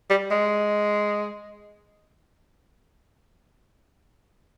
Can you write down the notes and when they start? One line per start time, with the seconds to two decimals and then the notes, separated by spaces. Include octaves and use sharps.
0.10 G3
0.31 G#3